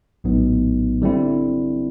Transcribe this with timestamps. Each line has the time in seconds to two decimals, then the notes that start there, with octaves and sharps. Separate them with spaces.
0.24 A#1 A2 F#3 B3 D#4
1.02 D3 G3 C4 E4